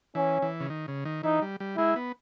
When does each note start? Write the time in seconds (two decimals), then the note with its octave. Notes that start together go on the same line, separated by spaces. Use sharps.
0.15 E3 C#4
0.42 E3
0.60 C#3
0.70 D#3
0.88 C#3
1.05 D#3
1.24 E3 D#4
1.42 G3
1.60 G3
1.77 G#3 E4
1.96 B3